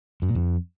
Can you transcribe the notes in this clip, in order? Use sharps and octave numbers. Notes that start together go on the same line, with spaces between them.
F#2
A#2
F2